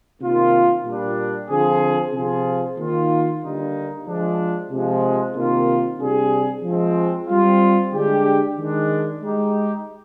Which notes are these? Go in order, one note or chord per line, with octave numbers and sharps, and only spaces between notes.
C3 D#3 A#3 F4
A#2 G3 D4
D3 F3 C4 F4 G#4
C3 F3 C4 F4 G#4
D#3 A#3 F4
D3 G3 A#3 D#4
F3 G#3 D4
C3 F3 G#3
C3 D#3 A#3 F4
C3 G3 D4 G#4
F3 G#3 C4
G3 C4 F4
D3 G#3 D4 G4
D#3 G#3 D4
G#3 D#4 G4